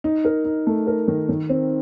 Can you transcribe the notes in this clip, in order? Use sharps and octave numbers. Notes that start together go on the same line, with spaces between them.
D#4
A#4
D#4
A3
A#4
D#3
D#3
C4